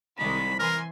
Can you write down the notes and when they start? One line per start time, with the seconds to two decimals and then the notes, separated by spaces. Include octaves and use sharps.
0.19 C2 D#3 G#3 B5
0.59 E3 A#4 G#5 C6